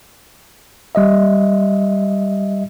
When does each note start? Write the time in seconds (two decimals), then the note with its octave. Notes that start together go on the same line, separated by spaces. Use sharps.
0.95 G3 D#5 E5